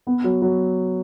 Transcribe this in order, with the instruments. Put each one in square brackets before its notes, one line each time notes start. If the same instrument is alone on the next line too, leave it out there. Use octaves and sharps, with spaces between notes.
[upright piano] B3
F#3
F#3